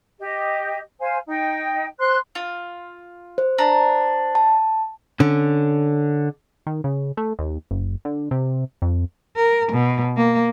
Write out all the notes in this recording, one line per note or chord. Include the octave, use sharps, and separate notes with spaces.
G4 D#5
C5 F5 G#5
D#4 G5
C5 C6 F#6
F4
C5
D4 A#5
A5
D3 C#4
D#3
C#3
A3
D#2
F#1
D3
C3
F2
A#4
B2
A#3